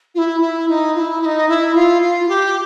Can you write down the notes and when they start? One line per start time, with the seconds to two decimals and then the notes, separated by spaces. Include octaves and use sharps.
0.15 F4
0.18 E4
0.41 E4
0.69 D#4
0.95 F4
0.99 E4
1.22 E4
1.25 D#4
1.49 E4
1.75 F4
2.02 F4
2.29 G4